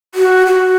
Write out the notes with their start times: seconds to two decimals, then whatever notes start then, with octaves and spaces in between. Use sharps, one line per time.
0.15 F#4
0.47 F#4